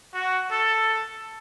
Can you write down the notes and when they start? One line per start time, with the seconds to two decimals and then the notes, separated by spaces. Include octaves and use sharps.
0.14 F#4
0.51 A4